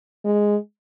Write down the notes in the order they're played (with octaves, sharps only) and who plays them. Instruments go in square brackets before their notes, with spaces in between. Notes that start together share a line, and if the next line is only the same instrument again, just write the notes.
[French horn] G#3